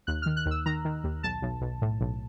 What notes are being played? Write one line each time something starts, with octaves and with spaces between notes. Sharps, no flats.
D#2 F#6
D#3 F6
F#6
D#2
E6
D#3 A#5
D#3
D#2
B1 A5
B1
B1
A2
B1